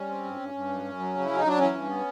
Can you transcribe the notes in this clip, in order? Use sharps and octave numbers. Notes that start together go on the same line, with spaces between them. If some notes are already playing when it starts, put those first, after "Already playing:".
Already playing: G3 C#4
C4
G2
G2
G2
F#2
F#2
F#3
C#3
F#3 E4
D#4
F#3 D4
E3 C#4
G2
B3